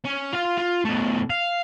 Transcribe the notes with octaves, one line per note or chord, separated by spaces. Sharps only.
C#4
F4 F5
F4
B2 A3
F5